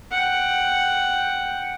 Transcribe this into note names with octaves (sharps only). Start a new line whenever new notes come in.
F#5 G5